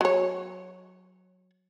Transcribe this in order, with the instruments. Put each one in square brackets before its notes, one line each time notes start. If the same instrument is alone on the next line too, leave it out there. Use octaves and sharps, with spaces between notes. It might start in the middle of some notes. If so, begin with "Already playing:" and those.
[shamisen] F#3 C#5